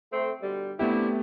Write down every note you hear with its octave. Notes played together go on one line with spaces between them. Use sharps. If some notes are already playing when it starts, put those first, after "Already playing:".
A3 C4
B2 D3 G3
A3 B3 C4 D4 E4 G4